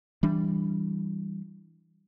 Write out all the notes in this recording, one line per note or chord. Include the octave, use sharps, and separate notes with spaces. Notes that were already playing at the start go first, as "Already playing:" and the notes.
E3 G3 D4